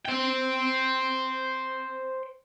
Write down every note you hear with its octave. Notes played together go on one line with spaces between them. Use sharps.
C5 G5